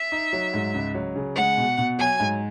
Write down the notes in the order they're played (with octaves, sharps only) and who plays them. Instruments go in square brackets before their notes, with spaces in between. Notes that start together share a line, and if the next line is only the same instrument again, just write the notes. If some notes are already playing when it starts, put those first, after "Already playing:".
Already playing: [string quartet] E5
[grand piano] D#4
F#3
G#2
C#2
F#3
C#3
[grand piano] G#3 [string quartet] F#5
[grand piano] B2
B2
[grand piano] F#3 [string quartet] G#5
[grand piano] G#2